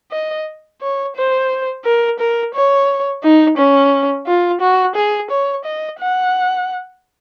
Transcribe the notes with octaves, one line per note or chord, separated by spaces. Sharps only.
D#5
C#5
C5
A#4
A#4
C#5
D#4
C#4
F4
F#4
G#4
C#5
D#5
F#5